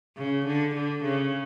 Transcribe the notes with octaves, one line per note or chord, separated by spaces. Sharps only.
C#3
D3
D3
C#3